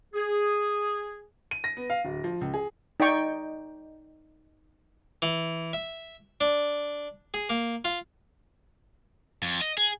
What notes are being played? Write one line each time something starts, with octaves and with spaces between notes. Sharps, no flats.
G#4
D#7
A#6
B3
F5
D1
F3
C#2
G#4
D#4 D5 D#5 G5 C#6
E3
E5
D4
G#4
A#3
F4
F2
D#5
G#4